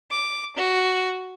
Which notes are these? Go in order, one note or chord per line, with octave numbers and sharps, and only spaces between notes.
D6
F#4